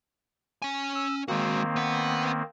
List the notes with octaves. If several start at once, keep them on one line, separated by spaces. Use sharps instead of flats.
C#4 G#5
E6
D#3 G#3 A#3 C4 F#4
B3 F#5